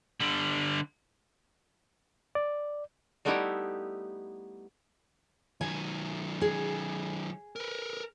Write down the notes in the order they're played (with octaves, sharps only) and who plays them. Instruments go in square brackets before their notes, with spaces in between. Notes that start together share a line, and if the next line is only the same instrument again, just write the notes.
[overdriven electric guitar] D3 G3
[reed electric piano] D5
[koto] G3 A3 B3 D#4 E4 G4
[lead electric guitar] D#3 F#3 [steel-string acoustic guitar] G#5
[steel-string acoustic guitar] G#4
[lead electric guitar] A#4 B4